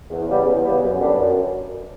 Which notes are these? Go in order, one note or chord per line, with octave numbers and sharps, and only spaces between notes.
E2
C#3 G3 B3
E2
C#3 G3 B3
F#2
D3 G3 B3 D4
F#2